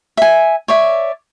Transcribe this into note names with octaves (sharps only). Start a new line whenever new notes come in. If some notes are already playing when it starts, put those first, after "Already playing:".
E5 G#5
C#5 D5 E5